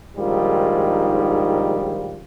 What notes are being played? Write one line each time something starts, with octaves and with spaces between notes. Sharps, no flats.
A#1 G#2 D#3 G3 F4